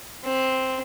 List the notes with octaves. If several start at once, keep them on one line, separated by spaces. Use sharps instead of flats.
C4